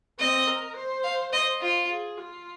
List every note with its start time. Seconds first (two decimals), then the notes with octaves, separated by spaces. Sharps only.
0.19 C4 D#5
0.47 A#4
0.76 C5
1.04 F5
1.32 C5 D#5
1.61 F4
1.89 G#4
2.18 F4